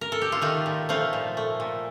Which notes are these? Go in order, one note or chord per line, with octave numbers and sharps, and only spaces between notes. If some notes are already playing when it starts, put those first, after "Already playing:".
A#4
A4
G4
F4
D#3 A3 D#4
A#2
F3 A3 F4
A#2
A3
A#2